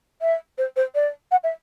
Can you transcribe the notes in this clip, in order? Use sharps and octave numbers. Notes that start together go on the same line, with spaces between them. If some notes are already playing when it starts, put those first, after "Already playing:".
E5
C5
C5
D5
F#5
E5